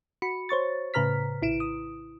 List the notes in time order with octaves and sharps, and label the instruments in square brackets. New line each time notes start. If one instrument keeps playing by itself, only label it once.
[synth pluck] F#4 B5 C#7
C5 C#5 C#6 A6
A2 C#3 B4 A#5 F6 B6
A#1 E4 D7 E7
D#6